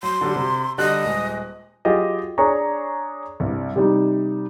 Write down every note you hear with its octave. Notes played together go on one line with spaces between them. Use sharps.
F#3 C6
D3 F#3 G3
C3
D3 G3 D#5 F#6
D#1 G#3
F#3 F4 G4 G#4 D#5
D4 G#4 C#5 A#5 C#6
C2 G2
C3 G3 D#4